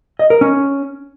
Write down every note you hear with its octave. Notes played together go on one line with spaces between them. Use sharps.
D#5
A#4
C#4